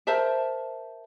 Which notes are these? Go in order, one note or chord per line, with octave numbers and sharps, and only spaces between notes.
A#4 C5 E5 A5